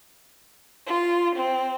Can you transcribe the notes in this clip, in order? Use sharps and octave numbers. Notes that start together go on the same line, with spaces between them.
F4
C4